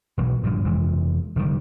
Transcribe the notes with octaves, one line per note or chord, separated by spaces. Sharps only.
E1 B1 E3 F#3
A#1 G2 A#2 D3
F1 F2 E3 G#3
F1 D3 D#3 G3